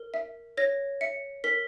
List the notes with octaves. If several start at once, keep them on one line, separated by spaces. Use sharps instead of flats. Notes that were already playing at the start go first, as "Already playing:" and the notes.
Already playing: A#4
E5
C#5 A#6
E5 C#7
A#4 B6